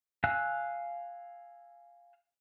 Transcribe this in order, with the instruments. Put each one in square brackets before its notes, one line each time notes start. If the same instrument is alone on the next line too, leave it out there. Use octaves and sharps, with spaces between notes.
[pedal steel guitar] F5 G#5 E6 F#6